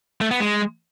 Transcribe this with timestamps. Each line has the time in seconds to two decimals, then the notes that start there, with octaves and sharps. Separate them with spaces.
0.21 A3
0.31 B3
0.40 G#3